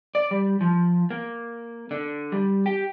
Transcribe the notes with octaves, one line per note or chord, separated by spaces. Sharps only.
D5
G3
F3
A#3
D3
G3
G4